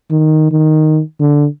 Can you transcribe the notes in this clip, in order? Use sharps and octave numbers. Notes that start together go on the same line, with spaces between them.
D#3
D#3
D3